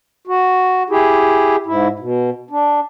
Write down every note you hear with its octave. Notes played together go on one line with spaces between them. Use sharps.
F#4
E4 G4 G#4
G#2 E4
B2
D4